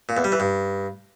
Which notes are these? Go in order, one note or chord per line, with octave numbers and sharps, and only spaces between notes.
A#2
E2
G3
E3
G2